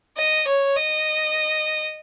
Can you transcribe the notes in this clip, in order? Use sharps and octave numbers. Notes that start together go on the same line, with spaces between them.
D#5
C#5
D#5